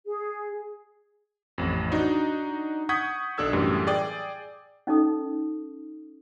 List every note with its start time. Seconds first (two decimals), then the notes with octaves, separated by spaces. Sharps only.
0.06 G#4
1.58 A1 F2
1.92 D4 D#4 F#4
2.89 F#5 C#6 D#6 G6 G#6 B6
3.38 B1 D4 A4 E6 G#6
3.53 F#2 A2 E3 G3
3.87 G#4 D5 G5
4.87 C#4 D#4 A4 D#6